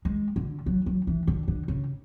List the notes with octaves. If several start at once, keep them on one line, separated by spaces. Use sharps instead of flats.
G#3
D3
F#3
F#3
E3
D3
D3
C#3